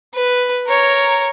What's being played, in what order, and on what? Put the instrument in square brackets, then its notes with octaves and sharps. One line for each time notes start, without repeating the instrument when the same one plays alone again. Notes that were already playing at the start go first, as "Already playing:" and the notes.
[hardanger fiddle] B4
A#4 C#5